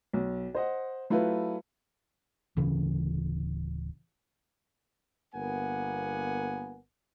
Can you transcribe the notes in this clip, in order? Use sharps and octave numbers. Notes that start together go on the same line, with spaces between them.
B1
C5 D#5 F#5
F#3 A3 E4 F4 B4
D1 C#3 E3
G1 A#3 B3 A#4 F#5 G#5